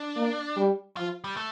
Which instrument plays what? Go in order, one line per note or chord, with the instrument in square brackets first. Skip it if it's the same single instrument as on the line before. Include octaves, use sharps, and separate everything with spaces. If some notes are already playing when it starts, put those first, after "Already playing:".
Already playing: [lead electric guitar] D4
[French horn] A#3
G3
[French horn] F3 [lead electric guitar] F4
[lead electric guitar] G3
A3